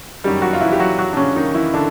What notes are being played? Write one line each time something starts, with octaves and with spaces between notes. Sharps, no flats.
F#1 F#2 D#3 F#3 G3 G4
F#3 F#4
F4
E3 E4
G4
F#3 F#4
F#3 F#4
D4
C#3 C#4
D#3 D#4
E3 E4
D3 D4